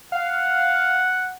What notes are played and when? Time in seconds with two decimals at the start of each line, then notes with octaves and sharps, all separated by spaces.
0.12 F5 F#5